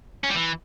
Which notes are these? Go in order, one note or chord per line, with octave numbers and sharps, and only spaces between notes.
C#4
G3
E3